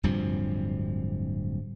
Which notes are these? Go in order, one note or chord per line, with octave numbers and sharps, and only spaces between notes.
D1 G2 C3 F3